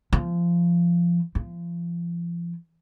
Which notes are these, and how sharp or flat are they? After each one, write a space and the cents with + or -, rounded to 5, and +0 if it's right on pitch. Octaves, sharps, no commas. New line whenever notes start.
F3 -20
F3 -35